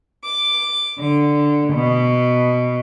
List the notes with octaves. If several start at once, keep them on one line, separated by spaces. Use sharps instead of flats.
D6
D3
B2